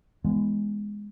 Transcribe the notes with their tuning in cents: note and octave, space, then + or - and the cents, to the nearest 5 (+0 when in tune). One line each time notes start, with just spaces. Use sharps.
E3 +0 G#3 -5 B3 +0